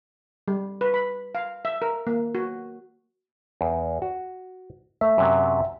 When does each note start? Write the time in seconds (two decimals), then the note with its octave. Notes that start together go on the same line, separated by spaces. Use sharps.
0.48 G3
0.81 B4
0.94 B5
1.35 F5
1.65 E5
1.82 A#4
2.07 A#3
2.35 F#4
3.61 E2
4.02 F#4
5.01 A3 E5
5.18 F#2 C3 F#3